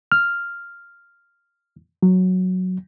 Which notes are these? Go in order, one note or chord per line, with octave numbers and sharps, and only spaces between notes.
F6
F#3